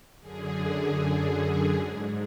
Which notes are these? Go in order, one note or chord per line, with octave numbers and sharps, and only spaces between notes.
F#2 D3 G#4
G#2